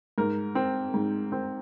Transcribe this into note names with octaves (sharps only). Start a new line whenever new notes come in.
G#2 A#4
C4
G#2
C4